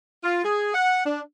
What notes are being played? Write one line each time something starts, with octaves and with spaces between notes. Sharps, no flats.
F4
G#4
F#5
D4